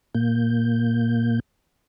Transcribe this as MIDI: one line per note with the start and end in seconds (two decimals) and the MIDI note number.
0.15 1.40 46
0.15 1.40 58
0.15 1.40 91